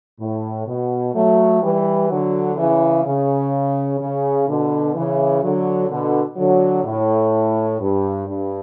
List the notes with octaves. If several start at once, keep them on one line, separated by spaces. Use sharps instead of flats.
A2
B2
F#3 A3
E3 G3
D3 F#3
C#3 E3
C#3
C#3
B2 D3
C#3 E3
D3 F#3
B2 D3
D3 F#3
A2
G2
G2